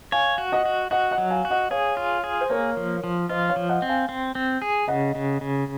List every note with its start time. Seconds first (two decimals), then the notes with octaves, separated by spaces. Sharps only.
0.12 C#5 F5 G#5
0.38 F#4
0.52 D#5 F#5
0.65 F#4
0.91 F#4 D#5 F#5
1.11 D#5 F#5
1.18 F#3
1.31 F5 G#5
1.45 F#4
1.50 D#5 F#5
1.70 G#4 C#5 F5
1.97 F4
2.24 G#4
2.41 C5
2.50 A#3 A#4 C#5
2.77 F3
3.04 F3
3.29 F4 C5 D#5
3.49 C#5 F5
3.56 F3
3.69 D#5 F#5
3.82 C4
3.89 F5 G#5
4.09 C4
4.35 C4
4.62 G#4
4.88 C#3 D#5 F#5
5.15 C#3
5.41 C#3